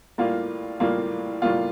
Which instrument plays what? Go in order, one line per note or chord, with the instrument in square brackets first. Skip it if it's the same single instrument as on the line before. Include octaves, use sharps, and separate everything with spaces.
[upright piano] A2 G3 A#3 F4
A2 G3 A#3 F4
A2 G3 A#3 F4